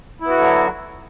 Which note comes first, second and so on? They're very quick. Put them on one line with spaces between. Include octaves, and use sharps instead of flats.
E4 B3 F#4 D3 F#3